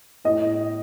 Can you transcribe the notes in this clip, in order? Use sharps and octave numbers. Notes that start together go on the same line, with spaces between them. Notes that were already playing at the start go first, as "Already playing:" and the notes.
A2 D#5